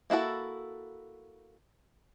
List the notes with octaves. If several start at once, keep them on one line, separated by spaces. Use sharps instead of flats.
A#3 E4 F#4 A4